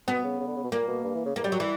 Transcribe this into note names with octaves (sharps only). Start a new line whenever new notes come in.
B2 B3
C#3
C#3
D3
C#3
B2
A#2 A#3
B2
G2
E3
C#3
E2 A#3
F#2 G3
F#3
E3